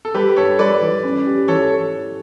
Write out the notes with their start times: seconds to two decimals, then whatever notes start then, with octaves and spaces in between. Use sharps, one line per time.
0.05 A4
0.14 G3 G4 B4
0.36 G2 A4 C#5
0.59 G3 B4 D5
0.81 E3
1.04 C#4
1.26 G4
1.48 E3 A4 C#5